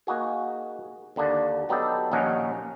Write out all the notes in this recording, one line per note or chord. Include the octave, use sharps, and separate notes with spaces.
A#3 D#4 F#4 G#4
D#2 D3 A#3 D4
F#3 B3 D#4 G4 A4
A#1 D#2 A#2 C#4 D#4 F#5